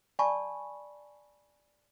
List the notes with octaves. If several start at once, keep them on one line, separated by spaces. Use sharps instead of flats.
D5 G#5 A5 B5 C#6